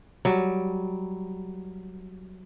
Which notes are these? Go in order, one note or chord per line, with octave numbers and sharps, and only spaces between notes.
F#3 G3